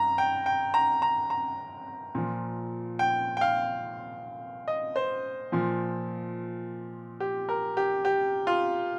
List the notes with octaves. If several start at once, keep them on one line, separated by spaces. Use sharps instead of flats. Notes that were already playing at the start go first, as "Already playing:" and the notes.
Already playing: G2 A#5
G5
G5
A#5
A#5
A#5
A#2 F3
G5
G5
F5
D#5
C5
A#2 F3
G4
A#4
G4
G4
F4